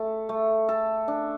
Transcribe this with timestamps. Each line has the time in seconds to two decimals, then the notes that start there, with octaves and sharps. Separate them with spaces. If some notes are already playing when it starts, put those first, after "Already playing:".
Already playing: A3 A4
0.29 A3
0.69 A4
1.08 D4